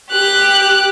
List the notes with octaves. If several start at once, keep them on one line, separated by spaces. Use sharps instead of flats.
G4 F#6